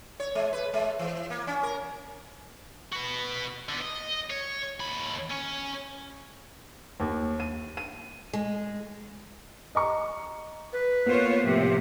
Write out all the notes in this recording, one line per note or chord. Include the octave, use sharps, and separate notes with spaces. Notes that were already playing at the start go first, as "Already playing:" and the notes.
C#5
G#3
B4
G#3
E3
A#3
C#4
A#4
F#4 B4
D3 B3
D#5
C#5
D#2 B5
C#4
D#2
D#7
D#7
G#3
D#5 A#5 C#6
B4
A#3 B3 F4 C5 C#5
A2 C3 F3